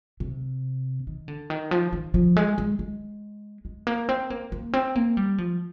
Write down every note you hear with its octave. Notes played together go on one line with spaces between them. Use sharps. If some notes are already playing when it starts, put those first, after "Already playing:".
C3
D#3
D3
D#3
F3
D#3
F3
G#3
G#3
G#3
G#3
A#3
C4
A#3
A#3
C4
A#3
G3
F3